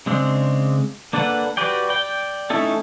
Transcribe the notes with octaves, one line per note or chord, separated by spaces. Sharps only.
C#3 G#3 C4 D4
A#3 D4 A4 B4 F#5
F#4 G4 B4 D5 G5
D5 G5
A3 C#4 D#4 E4 A4